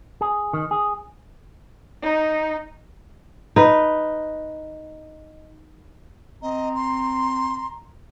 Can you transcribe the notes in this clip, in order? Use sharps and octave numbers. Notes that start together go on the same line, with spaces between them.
G#4
D#3
G#4
D#4
D#4 B4
C4 D#5 A#5
C6